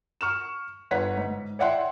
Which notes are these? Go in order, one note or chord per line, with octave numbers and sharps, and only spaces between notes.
C#6 F6 E7
G1 B4 C#5 F#5 B6
G#2
C#5 D5 E5 F#5 G5 C6